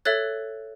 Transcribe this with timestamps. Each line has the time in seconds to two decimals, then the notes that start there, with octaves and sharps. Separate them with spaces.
0.05 A4 C#5 E5 F#6 A6